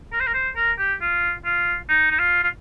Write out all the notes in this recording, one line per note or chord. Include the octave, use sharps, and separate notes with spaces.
A#4
C5
A#4
C5
A#4
G4
F4
F4
D#4
D#4
F4
F4